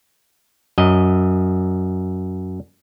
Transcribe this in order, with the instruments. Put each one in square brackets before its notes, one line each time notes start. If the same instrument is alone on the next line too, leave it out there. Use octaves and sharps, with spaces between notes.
[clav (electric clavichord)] F#2 D#5